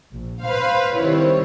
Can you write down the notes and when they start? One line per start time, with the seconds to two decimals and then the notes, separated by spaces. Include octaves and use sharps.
0.11 A#1
0.43 B4 C5 F5
0.96 D#3 G3 C4 E4 C#5